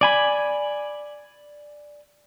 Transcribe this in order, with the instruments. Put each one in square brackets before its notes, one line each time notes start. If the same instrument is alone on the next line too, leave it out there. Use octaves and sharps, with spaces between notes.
[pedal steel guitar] D5 G#5 B5